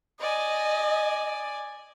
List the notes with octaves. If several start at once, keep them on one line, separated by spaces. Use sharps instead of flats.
D5 D#5 G#5